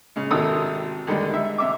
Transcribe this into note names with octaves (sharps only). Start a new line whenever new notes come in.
C#3 G#3
G#1 C3 D#3 A4 D#6 E6
D3 D#3 G3 G#3
D#4 E5
C3 E5 D6